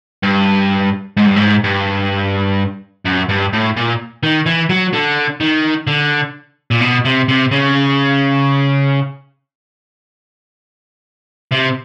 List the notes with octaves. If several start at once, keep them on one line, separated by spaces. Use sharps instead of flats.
G2
G#2
G2
G#2
G2
F#2
G2
A2
A#2
D#3
E3
F#3
D3
D#3
D3
A#2
B2
C3
C3
C#3
C3